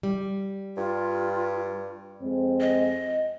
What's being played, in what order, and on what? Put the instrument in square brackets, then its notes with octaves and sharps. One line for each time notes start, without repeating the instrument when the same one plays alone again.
[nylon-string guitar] G3
[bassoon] G2 [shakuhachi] F4
[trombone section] F2 G#3 C4
[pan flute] D#5